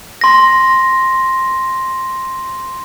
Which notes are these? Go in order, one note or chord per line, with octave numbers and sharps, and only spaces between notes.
C6 A#6